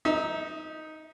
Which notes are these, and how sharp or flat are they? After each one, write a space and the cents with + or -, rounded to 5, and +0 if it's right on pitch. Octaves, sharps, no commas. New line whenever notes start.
D#4 +5 E5 -30